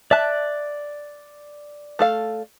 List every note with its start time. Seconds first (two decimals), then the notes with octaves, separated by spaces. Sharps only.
0.11 D5 E5 A5 F#6
1.99 A3 A4 F5